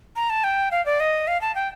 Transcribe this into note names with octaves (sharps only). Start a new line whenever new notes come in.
A#5
A5
G5
F5
D5
D#5
F5
A5
G5